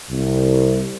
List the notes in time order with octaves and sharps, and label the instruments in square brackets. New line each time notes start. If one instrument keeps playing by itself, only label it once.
[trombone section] C2